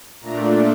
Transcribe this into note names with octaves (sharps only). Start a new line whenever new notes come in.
A#2 A3 D4 A#5